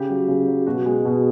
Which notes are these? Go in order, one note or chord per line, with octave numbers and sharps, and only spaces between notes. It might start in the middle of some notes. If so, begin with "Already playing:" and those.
Already playing: C#3 G4
F#3
C#3
F#3
B2 F#4
G#3
B2